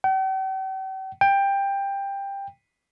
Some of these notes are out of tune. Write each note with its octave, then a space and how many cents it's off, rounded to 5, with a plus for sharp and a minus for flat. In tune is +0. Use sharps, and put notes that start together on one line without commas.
G5 -45
G5 +15